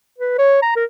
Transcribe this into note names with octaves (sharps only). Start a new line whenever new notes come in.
B4
C#5
A#5
A#4